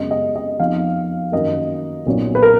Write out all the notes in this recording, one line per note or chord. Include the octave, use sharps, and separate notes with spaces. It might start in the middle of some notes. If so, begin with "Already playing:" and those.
Already playing: F#2 C#3 G#3 B3 D#5
D#5
D#5
F2 F3 B3 D#4 F5
F#2 D#3 A#3 D#5
B1 A#2 F#3 C#4
B4
A#4